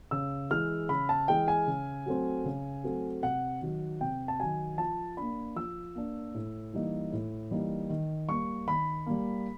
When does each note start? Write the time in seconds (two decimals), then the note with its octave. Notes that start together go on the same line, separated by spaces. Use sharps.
0.11 C#3 E6
0.51 E3 G#3 F6
0.89 C#3 B5
1.09 A5
1.28 E3 G#3 G5
1.48 G#5
1.67 C#3
2.06 F#3 A3 C4
2.45 C#3
2.84 F#3 A3 C4
3.23 C3 F#5
3.61 D#3 F#3
4.01 C3 G5
4.28 A5
4.40 D#3 F#3 G#5
4.78 F3 A5
5.17 A#3 D4 B5
5.56 F3 E6
5.95 A#3 D4
6.34 A2
6.73 E3 G3 A#3 D#4
7.12 A2
7.51 E3 G3 A#3 D#4
7.90 D#3
8.28 G3 A#3 C#6
8.67 D#3 B5
9.06 G3 A#3